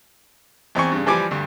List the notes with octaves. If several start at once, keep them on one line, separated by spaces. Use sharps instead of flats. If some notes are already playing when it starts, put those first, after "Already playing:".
E2 C4 G#5 C#6
G2 C#3
E3 F3 G3 G#5 D6
D2 G2